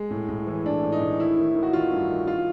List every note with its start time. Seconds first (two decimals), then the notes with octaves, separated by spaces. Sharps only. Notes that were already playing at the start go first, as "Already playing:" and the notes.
Already playing: G#3
0.11 A2
0.29 A2
0.47 E3
0.66 A2 D4
0.83 A2
0.92 D#4
1.01 A2
1.20 D#3 E4
1.38 D#3
1.55 D#3
1.63 F#4
1.73 D#3 F4
1.92 G2
2.09 D#3
2.27 F4